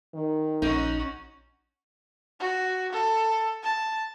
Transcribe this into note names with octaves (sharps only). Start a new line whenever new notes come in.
D#3
A#1 C#4 D#4 F#4
F#4
A4
A5